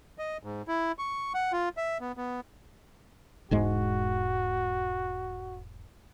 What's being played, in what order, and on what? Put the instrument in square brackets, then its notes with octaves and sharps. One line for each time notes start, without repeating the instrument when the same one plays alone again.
[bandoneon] D#5
G#2
E4
C#6
F#5
F4
E5
B3
B3
[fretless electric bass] E1 G#2 G#3 [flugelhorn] F#4